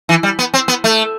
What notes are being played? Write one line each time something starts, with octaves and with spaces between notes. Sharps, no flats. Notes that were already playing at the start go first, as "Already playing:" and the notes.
E3
G3
B3
C4
B3
A3